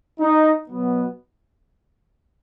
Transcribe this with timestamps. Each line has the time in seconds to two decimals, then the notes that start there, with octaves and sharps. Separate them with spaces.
0.20 D#4
0.68 B2 F#3 B3